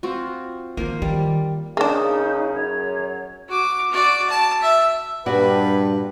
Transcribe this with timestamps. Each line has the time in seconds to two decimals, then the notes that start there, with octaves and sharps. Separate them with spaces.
0.03 C4 F4 F#4
0.77 D#3 F3 A#3
1.02 D#3 G3
1.77 C#3 A#3 D4 D#4 G#4
2.53 F#2 C#5
3.48 F#4 D6
3.91 F#4 D5
4.29 A5
4.61 E5
5.26 G2 A#2 F#4 B4 D5